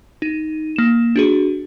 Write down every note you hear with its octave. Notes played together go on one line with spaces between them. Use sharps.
D#4 D#7
A#3 E7
D4 F#4 G#4